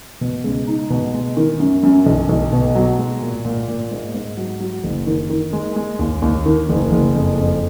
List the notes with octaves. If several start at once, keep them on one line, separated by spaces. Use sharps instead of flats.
B2
C#2
D#4
B2
G#3
D#3
F#2
F#2
B1
B1
B2
F#3
G#3
A#2
A#2
A#2
G#2
G#2
F#3
F#3
F#1
D#3
D#3
G#3
G#3
D#2
D#2
D#3
F#1
F#1
F2
F2